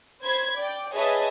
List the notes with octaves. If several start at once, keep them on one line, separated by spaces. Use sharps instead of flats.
C5 B5 G#6
D5 G5
G#4 B4 C#5 D#5 E5 A5